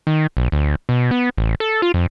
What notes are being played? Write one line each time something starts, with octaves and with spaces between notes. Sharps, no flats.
D#3
B1
D2
B2
B3
A1
A4
F4
F2